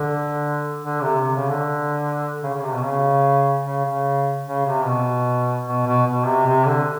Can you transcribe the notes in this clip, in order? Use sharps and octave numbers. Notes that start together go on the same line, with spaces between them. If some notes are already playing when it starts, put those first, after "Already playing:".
Already playing: D3
D3
C3
C3
C#3
D3
C#3
C#3
C3
B2
C#3
C#3
C#3
C#3
C3
B2
B2
B2
B2
C3
C3
D3